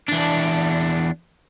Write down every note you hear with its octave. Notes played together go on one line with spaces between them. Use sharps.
E2 D4